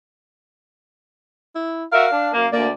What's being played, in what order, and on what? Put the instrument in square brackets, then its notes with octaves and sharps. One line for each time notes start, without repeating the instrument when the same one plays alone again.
[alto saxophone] E4
[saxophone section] F#4 A#4 E5 [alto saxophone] F5
[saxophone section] D4
F#2 A#3
[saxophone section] D2 D5 [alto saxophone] A#3